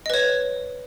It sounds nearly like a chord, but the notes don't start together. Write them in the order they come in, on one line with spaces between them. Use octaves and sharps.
D#5 B4 C#5